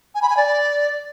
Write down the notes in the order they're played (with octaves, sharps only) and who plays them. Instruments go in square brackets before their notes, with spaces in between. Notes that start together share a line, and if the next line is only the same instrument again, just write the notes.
[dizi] G#5
B5
G#5
D5